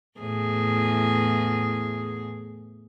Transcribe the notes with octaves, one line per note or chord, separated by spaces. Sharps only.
E2 A2 G#4